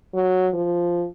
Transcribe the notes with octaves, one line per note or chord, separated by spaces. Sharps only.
F#3
F3